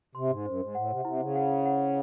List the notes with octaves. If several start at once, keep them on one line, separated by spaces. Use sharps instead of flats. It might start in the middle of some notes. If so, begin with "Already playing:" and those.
C3 C6
G#2
F#2 C5
G#2
A2 F#5
C3
C3 E4
C#3
F#5
F#5